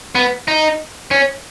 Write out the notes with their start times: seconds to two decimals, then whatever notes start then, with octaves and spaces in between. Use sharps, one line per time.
0.15 B3
0.48 D#4
1.11 C#4